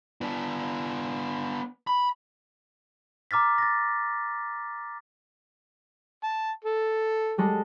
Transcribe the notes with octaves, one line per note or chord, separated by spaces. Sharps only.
B3 D4
B5
A#5 D6 F6 A6 B6
A6 A#6
A5
A4
G3 G#3 A4